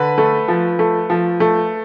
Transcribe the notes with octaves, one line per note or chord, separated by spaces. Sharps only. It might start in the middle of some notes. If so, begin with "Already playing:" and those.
Already playing: D3 B4
A3
F3
A3
F3
A3